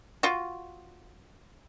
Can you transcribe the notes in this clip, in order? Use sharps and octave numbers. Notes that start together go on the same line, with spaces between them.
F4 F#4